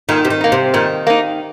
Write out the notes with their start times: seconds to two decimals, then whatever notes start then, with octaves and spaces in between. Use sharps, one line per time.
0.09 A#2 D#3
0.25 C3
0.30 D#3
0.41 A#3 D#4
0.52 C3
0.74 A#2 D#3
1.07 A#3 D#4